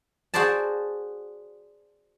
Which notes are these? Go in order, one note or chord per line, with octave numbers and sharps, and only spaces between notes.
F#4 G#4 C5 D5 A5